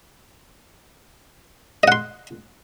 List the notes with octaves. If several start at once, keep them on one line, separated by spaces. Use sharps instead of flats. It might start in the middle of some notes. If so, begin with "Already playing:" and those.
D#5 F#5 C6